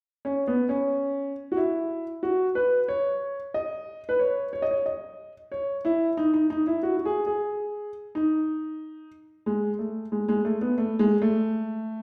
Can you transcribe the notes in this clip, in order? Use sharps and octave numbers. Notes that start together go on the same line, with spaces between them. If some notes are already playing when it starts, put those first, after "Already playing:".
C#4
B3
C#4
F#4
E4
F#4
B4
C#5
D#5
B4
C#5
C#5
D#5
C#5
D#5
C#5
E4
D#4
D#4
D#4
E4
F#4
F#4
G#4
G#4
D#4
G#3
A3
G#3
G#3
A3
B3
A3
G#3
A3